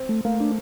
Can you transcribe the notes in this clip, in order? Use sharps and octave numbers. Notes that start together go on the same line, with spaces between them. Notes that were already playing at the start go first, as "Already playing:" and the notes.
Already playing: C4
A3
A3 A#3
D4